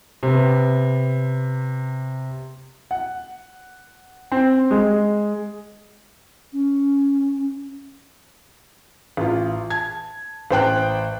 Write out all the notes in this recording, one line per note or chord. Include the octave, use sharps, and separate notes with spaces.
C3 B3
F#5
C4
G#3
C#4
A1 F4
A5 G#6
A1 C5 G5 F#6